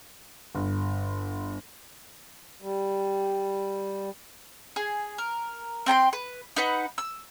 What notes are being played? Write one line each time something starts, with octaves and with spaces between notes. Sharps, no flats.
G1
G3
G#4
A#4
C4 G5 A5 C6
B4
D#4 B4 F#5
E6